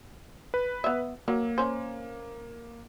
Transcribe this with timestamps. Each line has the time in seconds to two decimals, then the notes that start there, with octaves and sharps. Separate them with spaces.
0.54 B4
0.84 B3 E5
1.28 F#3 A#3
1.58 C#4 C5